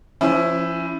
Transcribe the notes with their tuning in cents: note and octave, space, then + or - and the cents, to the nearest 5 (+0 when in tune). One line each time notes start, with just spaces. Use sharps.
F3 -25 C#4 +0 E4 +5